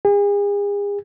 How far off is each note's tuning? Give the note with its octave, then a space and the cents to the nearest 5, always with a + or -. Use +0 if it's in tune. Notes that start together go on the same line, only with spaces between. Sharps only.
G#4 -40